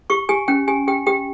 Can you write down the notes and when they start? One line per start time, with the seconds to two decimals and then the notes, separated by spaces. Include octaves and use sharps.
0.10 G4 C#6
0.29 G4 G#5
0.48 C#4 G5
0.68 G4 G#5
0.88 G4 G5
1.07 G4 G5